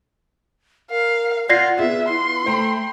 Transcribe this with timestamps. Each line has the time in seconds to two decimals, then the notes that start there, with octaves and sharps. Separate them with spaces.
0.91 A#4 F5
1.49 F4 D5 F#5 F#6 G#6 A#6 C7
1.79 B3 F4 G#4 E5
2.09 E4 C6
2.46 A3 C5 G5 A#5